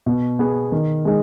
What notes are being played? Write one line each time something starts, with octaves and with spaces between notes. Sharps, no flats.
B2
B3 G#4
D#3
G#3 D#4 G#4